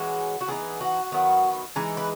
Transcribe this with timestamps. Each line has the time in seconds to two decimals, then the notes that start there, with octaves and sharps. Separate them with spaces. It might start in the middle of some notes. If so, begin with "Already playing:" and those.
Already playing: E3 G#3 C#4 F#4
0.41 F#4
0.48 E3 B3 D#4 G#4
0.81 F#4
1.12 D#3 F#3 B3 E4
1.76 E3 G#3 D#4
1.97 B4